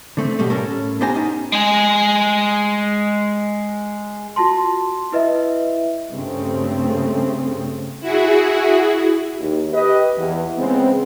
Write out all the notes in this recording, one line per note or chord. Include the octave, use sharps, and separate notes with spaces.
D3 A3 C4
B2 G3 A3
A2 C#4 A4 A#4
B3 D4 G4 C5 G#5 A#5
C#4 D#4
G#3 G#4
F4 F#4 A5 C6
E4 B4 D#5 E5
G2 C#3 A3 C4 C#4
E4 F#4 G#4
D#2
G4 B4 D#5
E2
C#3 G#3 B3 C4